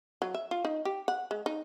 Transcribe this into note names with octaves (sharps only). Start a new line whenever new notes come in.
F#3
E5
F4
D#4
G4
F#5
G#3
D#4